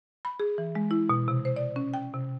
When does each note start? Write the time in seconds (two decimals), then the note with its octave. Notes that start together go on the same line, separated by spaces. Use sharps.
0.25 B5
0.40 G#4
0.58 E3
0.75 G#3
0.91 E4
1.10 B2
1.28 C3
1.45 C5
1.56 D5
1.76 C#4
1.94 G5
2.14 C3